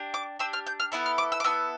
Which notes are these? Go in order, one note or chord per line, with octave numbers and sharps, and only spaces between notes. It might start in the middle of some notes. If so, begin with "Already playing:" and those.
Already playing: D4 G4
D6
D4 G4 E6
F6
G6
F6
B3 E4 A4
F6
D6
E6
D6
B3 E4 A4 E6